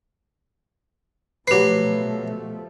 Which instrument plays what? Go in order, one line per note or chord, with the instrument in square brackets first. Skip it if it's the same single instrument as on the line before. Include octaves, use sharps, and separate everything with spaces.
[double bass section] B2 F3 A3 [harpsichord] F#3 B4 [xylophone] G4 C7